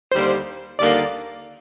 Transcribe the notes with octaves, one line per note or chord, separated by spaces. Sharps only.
D#2 D3 G3 A#3 C5
D#2 D3 G3 A#3 D5